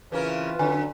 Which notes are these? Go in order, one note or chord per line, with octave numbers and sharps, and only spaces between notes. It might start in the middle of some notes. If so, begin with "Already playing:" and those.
C#3 E3 C4 C#4 F4 A#4 B4
D3 F#3 C#4 G#5